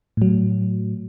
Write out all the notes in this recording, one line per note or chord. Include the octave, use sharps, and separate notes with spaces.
A2 F#3